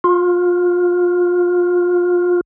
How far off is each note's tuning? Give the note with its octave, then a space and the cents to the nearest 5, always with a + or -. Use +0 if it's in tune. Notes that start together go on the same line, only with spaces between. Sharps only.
F4 +25